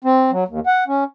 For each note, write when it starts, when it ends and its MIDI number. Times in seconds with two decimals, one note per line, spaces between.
0.04 0.31 60
0.31 0.44 54
0.48 0.60 39
0.66 0.84 78
0.88 1.04 61